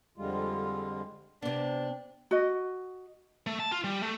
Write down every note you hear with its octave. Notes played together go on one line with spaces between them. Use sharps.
F2 D3 G3 G#3 F4
C3 B3 D4
F#4 D#5
A3
A5
F4
G3
A3